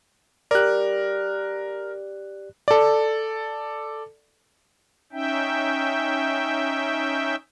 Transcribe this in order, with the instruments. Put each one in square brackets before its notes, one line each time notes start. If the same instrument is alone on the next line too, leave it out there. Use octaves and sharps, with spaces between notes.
[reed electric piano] G4 D5 [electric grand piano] A#4 F#6
[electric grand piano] A4 D5
[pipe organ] C#4 D#4 E5 G5